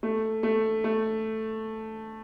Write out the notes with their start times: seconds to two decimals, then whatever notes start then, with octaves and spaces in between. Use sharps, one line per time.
0.03 A3
0.43 A3
0.84 A3